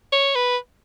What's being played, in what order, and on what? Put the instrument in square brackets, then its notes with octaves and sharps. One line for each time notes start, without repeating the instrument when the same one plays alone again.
[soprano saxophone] C#5
B4